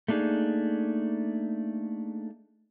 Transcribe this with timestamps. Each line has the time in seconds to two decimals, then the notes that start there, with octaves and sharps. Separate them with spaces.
0.08 A3 A#3 D4 D#4 G#4